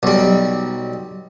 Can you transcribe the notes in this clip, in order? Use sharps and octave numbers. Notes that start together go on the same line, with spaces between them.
B1 G3